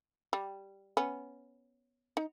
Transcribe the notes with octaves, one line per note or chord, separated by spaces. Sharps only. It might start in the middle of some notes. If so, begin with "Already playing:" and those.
G3
B3 C#4
D#4